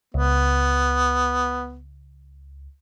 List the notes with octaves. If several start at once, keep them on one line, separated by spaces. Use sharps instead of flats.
C#2 B3